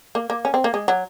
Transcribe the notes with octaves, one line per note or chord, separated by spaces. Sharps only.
A#3
A#3
C#4
C4
A#3
G#3
F#3